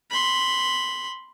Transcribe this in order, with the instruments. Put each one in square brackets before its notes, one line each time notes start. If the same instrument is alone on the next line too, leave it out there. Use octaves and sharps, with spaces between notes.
[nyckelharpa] B5 C6